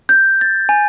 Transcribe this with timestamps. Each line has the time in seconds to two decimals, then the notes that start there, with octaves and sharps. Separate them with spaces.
0.09 G6
0.41 A6
0.69 G#5